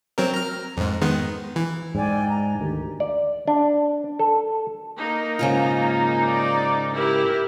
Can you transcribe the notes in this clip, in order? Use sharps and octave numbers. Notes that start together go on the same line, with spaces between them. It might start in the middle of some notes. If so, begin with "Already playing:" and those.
F#3 C4 A#4
A#5 F6
F2 G#2
D#3 G#3 B3
E3
G#2 D5 G5 G#5
A#5
D2 D#3 G4
D5
D4
A4
A#3 D#4
G#2 C#3 F4
D5
E4 G4 A#4